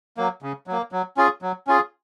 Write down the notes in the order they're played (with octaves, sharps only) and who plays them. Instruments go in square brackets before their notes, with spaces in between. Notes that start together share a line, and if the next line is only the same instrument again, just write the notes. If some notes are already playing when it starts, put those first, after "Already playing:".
[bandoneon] F#3 A#3
C#3
F#3 A#3
F#3
C#4 F4 G#4
F#3
C#4 F4 G#4